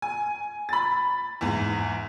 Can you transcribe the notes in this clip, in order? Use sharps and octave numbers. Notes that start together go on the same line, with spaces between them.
G#5
B5 A6
E2 G#2